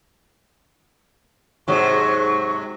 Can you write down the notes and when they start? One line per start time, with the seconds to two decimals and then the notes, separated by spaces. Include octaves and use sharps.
1.68 G#2 C3 F#3 C#6